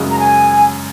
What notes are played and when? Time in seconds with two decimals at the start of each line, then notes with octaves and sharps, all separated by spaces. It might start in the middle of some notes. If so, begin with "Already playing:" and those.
Already playing: F#2 C#3 G#3 C#4 F#4
0.10 A#5
0.19 G#5